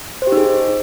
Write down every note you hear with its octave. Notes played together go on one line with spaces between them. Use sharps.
C5
G4
D#4
G#4